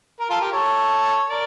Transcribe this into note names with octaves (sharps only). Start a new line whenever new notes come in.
A#4
F4 A4
G4 A#4
A4 C#5
A#4 D5